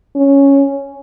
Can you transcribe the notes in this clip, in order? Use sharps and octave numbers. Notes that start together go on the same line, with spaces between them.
C#4